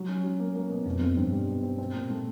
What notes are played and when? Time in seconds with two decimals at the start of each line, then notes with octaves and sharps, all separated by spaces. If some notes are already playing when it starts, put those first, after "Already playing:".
Already playing: F#3
0.09 C#4
0.24 F#3
0.40 A#3
0.55 A#3
0.70 B2
0.86 F2 B2
1.01 F2 B2
1.17 G2 C4
1.32 G3
1.48 B2
1.63 C4
1.78 C4
1.94 A#2
2.10 A3